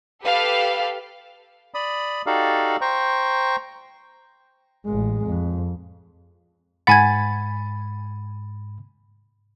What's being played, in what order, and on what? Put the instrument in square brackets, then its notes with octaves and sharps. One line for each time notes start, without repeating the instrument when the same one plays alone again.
[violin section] G4 A4 B4 F5
[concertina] D5 B5 D#6
D#4 F#4 G4 A4 D5 F5
C5 G5 A#5 C#6
[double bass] A1 G#3
F2
[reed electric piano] G#2 B5 A6 [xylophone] F#5 G#5 G#6